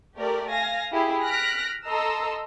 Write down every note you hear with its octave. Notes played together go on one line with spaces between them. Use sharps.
A3 G4 A#4 D5
F5 G#5 A#6
E4 G4 G#4
F6 F#6 A#6 B6 D7
A4 D#5 A#5 C6 E6